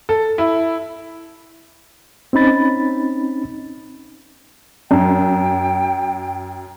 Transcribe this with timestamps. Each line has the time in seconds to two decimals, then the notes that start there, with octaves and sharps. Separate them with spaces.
0.09 A4
0.38 E4
2.33 C4 C#4 D#4 B5 A6
4.91 F#2 G5